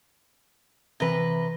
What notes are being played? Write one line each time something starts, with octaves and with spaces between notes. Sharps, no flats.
C3 E3 B4 A#6 G7